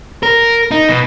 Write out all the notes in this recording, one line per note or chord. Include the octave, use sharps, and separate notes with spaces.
A#4
D#4
B2